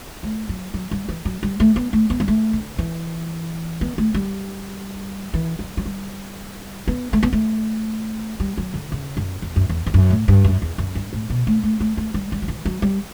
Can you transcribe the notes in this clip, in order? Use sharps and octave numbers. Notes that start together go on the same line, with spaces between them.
A3
F#3
F#3
G3
E3
F#3
G3
A3
B3
A3
B3
G3
A3
D3
E3
B3
A3
G3
E3
F#3
F#3
G3
B3
A3
B3
A3
G3
F#3
D3
C#3
F#2
E2
F#2
E2
E2
F#2
A2
G2
F#2
E2
F#2
G2
A2
B2
A3
A3
A3
A3
G3
G3
F#3
E3
F#3
G3